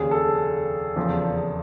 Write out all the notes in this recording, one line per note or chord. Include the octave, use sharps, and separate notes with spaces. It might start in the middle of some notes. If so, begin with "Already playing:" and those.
Already playing: F1 D#2 C#3 G#4
A4
F1 E2 C#3 F3